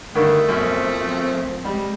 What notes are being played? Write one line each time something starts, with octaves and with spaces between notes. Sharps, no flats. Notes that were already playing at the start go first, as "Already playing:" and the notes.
G2 D3 D#3 A3 A#4 C#6
B1 F#2 F3 C4
G3 G#3